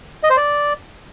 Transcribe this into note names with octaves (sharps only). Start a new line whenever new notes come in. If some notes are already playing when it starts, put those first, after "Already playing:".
D#5
C5
D5